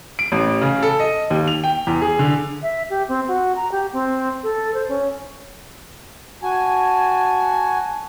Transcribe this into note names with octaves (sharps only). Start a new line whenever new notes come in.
D7
A1
C#3
A4
D#5
D#2
F7
G5
E2
G#4
D3
E5
G4
C4
F#4
A#5
G4
C4
A4
C5
C#4
F#4 G#5 A5